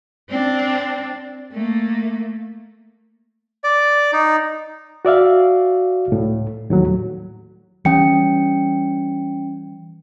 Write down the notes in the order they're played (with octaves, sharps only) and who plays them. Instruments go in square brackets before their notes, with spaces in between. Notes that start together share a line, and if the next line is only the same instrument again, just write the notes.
[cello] C4 D4
A3 A#3
[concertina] D5
D#4
[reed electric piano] F#4 D5 E5 F5
C#2 A2
D#2 A2 F#3
[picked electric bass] E3 G3 [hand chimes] C#4 G5 C#7